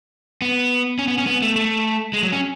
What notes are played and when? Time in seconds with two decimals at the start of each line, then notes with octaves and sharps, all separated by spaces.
0.42 B3
0.99 C#4
1.07 B3
1.18 C#4
1.26 B3
1.42 A3
1.56 A3
2.13 G#3
2.23 F#3
2.32 C#4